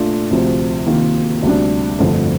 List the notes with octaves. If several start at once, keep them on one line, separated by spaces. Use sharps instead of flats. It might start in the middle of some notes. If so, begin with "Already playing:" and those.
Already playing: A#2 A3 D4 F4
D2 C3 F3 C4
C3 D#3 A#3 F4
D2 C3 G3 D4
G1 F2 D3 A3 C4